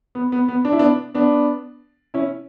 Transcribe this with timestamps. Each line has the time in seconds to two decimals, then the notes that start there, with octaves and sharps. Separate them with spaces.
0.15 B3
0.32 B3
0.48 B3
0.65 D4
0.72 E4
0.79 B3 D4
1.15 B3 D4
2.14 C#4 E4